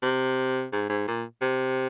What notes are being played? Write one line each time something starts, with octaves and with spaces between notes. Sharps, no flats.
C3
G#2
G#2
A#2
C3